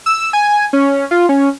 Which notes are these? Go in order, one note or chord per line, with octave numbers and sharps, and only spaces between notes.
E6
G#5
C#4
F4
C#4